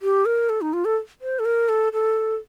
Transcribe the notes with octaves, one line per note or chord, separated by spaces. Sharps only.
G4
A#4
A4
D#4
F4
A4
C5
A4
A#4
A4
A4